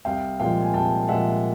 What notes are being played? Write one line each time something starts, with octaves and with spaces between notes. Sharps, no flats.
C2 F5 G5
A#2 F3 G#3 F5 G5
G#5
C2 G5 A5
A#2 F3 G#3 E5 F#5